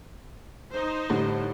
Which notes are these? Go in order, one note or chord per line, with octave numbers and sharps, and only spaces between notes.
D#4 C5
A2 D3 G3